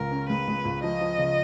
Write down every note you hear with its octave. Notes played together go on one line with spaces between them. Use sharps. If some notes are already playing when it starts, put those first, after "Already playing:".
Already playing: C#2 C#3 A#4
C#4
G#3 B4
G#3
C#2
F3 D#5
F3
C#3